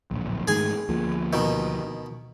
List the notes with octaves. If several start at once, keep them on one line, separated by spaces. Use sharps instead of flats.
D1 A#1
G#2 D#3 A3 G#4 G#5
D2 F3 A#3
B2 D#3